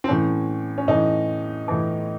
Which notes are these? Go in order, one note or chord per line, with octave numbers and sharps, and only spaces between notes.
C4
A2 E3 C#4
C#4
A2 E3 D#4
A2 E3